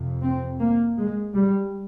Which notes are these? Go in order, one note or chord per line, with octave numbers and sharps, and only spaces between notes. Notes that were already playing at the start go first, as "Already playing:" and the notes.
Already playing: F2 C3
C4
A#3
G#3
G3